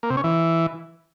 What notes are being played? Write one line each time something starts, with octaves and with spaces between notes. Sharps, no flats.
A#3
C3
C#4
E3